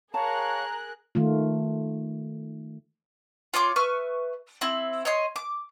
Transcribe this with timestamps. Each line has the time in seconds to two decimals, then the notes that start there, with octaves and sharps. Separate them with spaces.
0.14 G#4 A#4 C#5 F5 A5 A#5 C#6 F#6
1.15 D#3 A3 F4
3.54 F4 C#5 C6 D6
3.76 B4 E5 C#6 F6
4.61 C4 E4
5.05 C#5 D#5 C6
5.36 D6